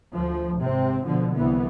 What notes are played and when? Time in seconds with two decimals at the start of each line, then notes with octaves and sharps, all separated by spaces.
0.13 D2 F3
0.63 G#1 C3 C4
1.05 B2 D3 F3
1.34 C2 E3 B3